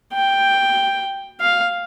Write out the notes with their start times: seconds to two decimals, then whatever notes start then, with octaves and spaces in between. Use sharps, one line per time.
0.14 G5
1.41 F5